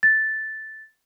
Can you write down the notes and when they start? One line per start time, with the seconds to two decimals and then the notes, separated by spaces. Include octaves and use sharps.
0.03 A6